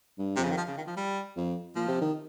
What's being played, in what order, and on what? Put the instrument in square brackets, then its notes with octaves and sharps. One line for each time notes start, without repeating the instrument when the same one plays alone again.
[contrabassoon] G2
[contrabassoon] F2 [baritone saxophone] C3
[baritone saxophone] C#3
D#3
F3
C#3
D#3
F3
G3
[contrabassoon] F2
[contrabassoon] A#2 [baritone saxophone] F3
[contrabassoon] C3
D#3